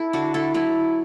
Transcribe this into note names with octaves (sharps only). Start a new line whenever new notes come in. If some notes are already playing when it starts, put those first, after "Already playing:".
Already playing: E4 A4
D3 D4 F#4
D3 E4 A4
F#3 E4